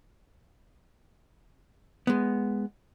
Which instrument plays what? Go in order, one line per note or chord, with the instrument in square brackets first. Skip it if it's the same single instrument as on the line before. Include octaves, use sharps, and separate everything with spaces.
[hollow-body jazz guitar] G#3 B3